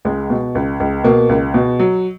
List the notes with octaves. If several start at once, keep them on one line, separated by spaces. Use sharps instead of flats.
C#2 G#3
B2
C#2
C#2
B2 A#3
C#2
B2
F#3